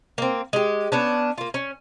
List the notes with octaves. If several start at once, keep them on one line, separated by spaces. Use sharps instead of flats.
A#3 C4
G#3 G4
B3 C#4 D4
A#3 F4
C#4